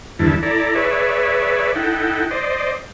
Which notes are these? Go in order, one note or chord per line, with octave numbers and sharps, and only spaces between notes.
E2 G2 D3 D#3 E4 A5
E4 A4 D5 A#5
G#4 B4 C#5 D5 E5
D#4 E4 A4 F#5 G5
C5 D5 D#5